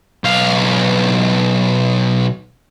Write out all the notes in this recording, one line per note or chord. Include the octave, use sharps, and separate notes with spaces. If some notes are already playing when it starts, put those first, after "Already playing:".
B1 F5